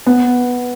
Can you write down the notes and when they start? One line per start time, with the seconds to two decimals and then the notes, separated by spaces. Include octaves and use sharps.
0.06 B3